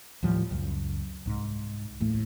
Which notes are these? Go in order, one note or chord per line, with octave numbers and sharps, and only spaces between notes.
D#2 A2 F3 G3
C#2 F#2
C2 G#2
A1 D#2 A2 A3